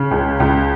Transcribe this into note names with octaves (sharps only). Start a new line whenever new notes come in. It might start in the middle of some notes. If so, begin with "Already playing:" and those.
Already playing: C#3
C#2
C#2